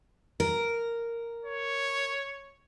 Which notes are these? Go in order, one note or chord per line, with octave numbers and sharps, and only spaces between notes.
A#4
C#5